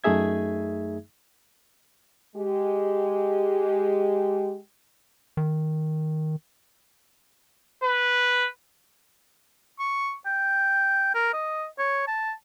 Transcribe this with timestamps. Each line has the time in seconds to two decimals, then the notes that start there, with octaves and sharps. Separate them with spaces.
0.04 F#2 A3 D#4 G#4 E5 G#6
2.36 G#3 G4
5.37 D#3
7.84 B4
9.79 C#6
10.26 G5
11.15 A#4
11.33 D#5
11.79 C#5
12.08 A5